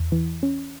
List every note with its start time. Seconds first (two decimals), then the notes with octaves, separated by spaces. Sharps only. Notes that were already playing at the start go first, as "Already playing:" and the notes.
Already playing: E2
0.12 E3
0.43 C#4